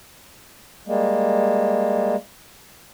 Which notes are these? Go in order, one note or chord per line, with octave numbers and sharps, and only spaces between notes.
G3 G#3 A#3